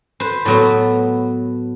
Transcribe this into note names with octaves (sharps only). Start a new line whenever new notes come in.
B4 C5
A2 F#3 B3